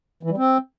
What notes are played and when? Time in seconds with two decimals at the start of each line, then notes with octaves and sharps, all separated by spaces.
0.23 E3
0.30 G3
0.38 C4